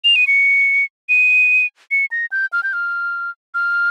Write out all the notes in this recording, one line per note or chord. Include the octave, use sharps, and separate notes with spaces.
F7
D#7
C#7
D#7
C#7
A#6
G6
F6
G6
F6
F6